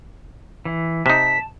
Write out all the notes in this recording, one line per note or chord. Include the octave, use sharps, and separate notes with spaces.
E3
C3 D#4 A5 B6